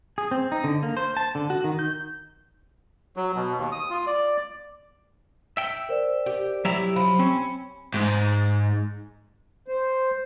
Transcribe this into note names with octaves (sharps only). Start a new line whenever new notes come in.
G#4
C4
D#4
D3
A#3
C5
A5
D3
F#4
D#3
G6
F#3
B2
D#2
D#6
F4
D5
E5 G5
A#4 C5 D5
G4
F#3 E4 G4 E5 A#5
F3 B5
C4 C#4
G#2
C5